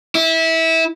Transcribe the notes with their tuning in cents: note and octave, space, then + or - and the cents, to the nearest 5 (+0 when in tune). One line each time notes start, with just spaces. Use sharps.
E4 -20